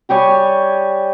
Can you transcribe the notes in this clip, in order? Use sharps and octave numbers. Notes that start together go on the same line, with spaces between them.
G3 G4 C#5 G#5